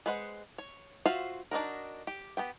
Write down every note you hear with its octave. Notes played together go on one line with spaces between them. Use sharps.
G#3 B4 C5 F#5
C#5
F4 F#4 C5 E5 F5
D4 D#4 F#4 A#4
G4
B3 G4 G5